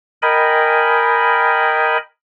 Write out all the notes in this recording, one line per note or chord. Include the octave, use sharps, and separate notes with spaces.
A#4 D#5 G5 G#5 B5